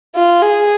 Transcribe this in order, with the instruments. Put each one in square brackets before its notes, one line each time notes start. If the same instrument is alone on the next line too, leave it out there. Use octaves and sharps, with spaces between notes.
[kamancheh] F4
G#4